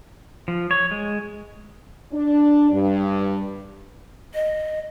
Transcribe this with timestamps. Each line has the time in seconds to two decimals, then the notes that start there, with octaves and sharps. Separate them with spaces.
0.48 F3
0.71 C#5
0.91 G#3
2.13 D4
2.71 G2
4.34 D#5